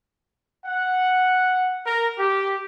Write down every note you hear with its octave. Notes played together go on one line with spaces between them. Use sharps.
F#5
A#4
G4